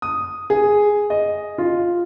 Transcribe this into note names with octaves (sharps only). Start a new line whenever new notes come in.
D#6
G#4
D#5
F4